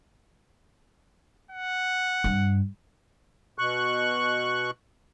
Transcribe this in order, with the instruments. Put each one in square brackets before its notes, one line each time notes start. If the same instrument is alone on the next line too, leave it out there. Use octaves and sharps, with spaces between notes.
[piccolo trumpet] F#5
[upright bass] G2 C4
[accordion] B2 C#6 F#6